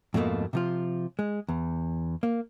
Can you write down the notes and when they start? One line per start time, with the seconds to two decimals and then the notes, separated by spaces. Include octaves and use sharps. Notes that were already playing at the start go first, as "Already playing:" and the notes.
0.14 F2 G#2 B2 A3 A#3
0.53 C3 F3 F4
1.19 G#3
1.49 E2
2.23 A#3